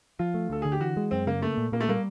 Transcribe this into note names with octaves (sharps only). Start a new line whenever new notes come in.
F3 F4
A3
D2 A4
D3 G#4
G4
E3 F#4
G#3
F#2 C4
C#3 A#3
A3 A#3
A#2
A#2 A#3
A3
G3 A#3